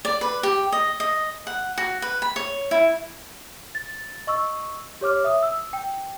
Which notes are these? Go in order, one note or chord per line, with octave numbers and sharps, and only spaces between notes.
D5
B4
G4
D#5
D#5
F#5
F#4
B4
B5
C#5
E4
A6
D#5 C#6 E6
G4 C#5 D6 F6
E5 D#6
E6
G5